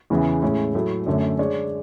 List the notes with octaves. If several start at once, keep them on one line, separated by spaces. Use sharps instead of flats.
E2 C#3 E3
A2 G#3 C#4 E4
A2 F#3 A3
F#2 D3 A3 C#4
G#3 D4 G#4 C#5